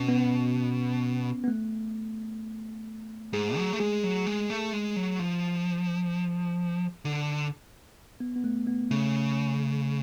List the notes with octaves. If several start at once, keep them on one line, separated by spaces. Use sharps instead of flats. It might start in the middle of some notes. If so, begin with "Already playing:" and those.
Already playing: B2 C#4
B3
B3
A3
G#2 G#4
F#3
A3
G#3 G#4
F#3
G#3
A3
G#3
F#3
F3
D3
B3
B3
A3
B3
C#3 A3